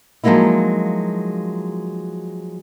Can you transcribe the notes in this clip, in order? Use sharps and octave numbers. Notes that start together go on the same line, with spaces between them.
F3 F#3 G#3 A#3 D#4 E4